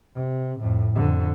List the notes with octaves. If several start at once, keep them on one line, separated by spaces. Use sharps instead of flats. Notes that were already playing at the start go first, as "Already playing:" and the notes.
C3
F2 A2
F2 D3